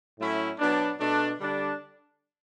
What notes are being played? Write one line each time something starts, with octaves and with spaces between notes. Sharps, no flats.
A2 F#3 A3 C#4 E4
B2 F#3 B3 D4
B2 A3 D4
D3 G3 D4